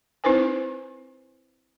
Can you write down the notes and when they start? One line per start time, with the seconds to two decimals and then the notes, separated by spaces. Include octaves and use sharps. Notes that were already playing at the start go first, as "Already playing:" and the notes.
0.24 C4 D#4 E4 B4 C5 G#5